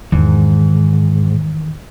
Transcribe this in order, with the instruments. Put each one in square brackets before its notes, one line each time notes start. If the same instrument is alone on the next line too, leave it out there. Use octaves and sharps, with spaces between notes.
[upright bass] E2 D#3 [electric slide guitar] G#2